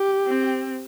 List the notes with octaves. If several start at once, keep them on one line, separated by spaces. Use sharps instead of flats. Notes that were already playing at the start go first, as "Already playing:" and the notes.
Already playing: G4
C4